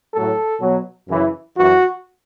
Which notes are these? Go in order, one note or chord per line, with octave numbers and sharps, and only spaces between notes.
A2 F#3 A4
B2 F#3
F#2 C#3 E3
F#2 E3 F#4